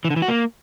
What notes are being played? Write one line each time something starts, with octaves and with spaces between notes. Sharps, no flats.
E3
D3
E3
F#4
A#3